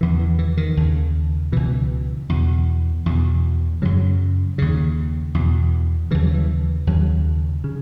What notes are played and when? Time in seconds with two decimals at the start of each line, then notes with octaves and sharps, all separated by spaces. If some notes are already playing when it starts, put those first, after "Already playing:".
0.01 E2 C#3 E3
0.19 E3
0.39 E3
0.57 D#3
0.77 D#2 C#3
1.52 C#2 B2 E3
2.29 E2 B2
3.06 E2 B2
3.82 F#2 C#3 F#3
4.58 D#2 C#3
5.34 E2 B2
6.11 D#2 C#3 E3
6.23 F#3
6.34 E3
6.87 D#2 C#3 F#3
7.64 C#3